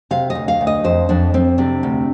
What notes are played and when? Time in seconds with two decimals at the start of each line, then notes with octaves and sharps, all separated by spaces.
0.11 C3 F5
0.30 D#5
0.35 D2
0.48 F5
0.61 D2
0.67 D#5
0.84 F2 C5
1.09 F2 D4
1.34 F2 C4
1.58 C3 D4
1.83 D2